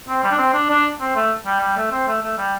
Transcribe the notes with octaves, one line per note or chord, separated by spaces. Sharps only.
C4
G3
D4
C4
D4
D4
C4
A3
G3
G3
A3
C4
A3
A3
G3